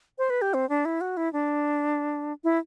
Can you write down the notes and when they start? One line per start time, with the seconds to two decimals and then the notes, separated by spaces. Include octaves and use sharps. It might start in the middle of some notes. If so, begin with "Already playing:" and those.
0.18 C5
0.30 B4
0.42 G4
0.54 C4
0.69 D4
0.85 E4
1.01 F#4
1.17 E4
1.33 D4
2.44 E4